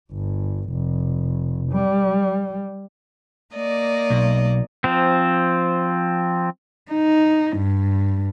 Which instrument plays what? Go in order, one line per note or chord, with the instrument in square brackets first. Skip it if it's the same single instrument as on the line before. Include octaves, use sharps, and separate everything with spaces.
[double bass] G1
F1
G3
[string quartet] A#3 D5 D#5
[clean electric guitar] B1
[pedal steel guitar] F3 C4
[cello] D#4
G2